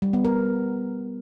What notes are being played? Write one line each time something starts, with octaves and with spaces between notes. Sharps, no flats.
G3
B3
A#4